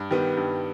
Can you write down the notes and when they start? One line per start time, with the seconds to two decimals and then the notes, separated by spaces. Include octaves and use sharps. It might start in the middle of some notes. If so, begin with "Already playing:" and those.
Already playing: G2
0.11 D#3 G3 B3
0.37 G2